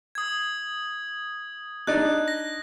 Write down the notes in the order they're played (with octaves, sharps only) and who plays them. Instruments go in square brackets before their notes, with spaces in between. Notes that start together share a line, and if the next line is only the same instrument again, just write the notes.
[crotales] D#6 G#6
[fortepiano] D4 D#4 D5 [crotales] F#6
[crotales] A#6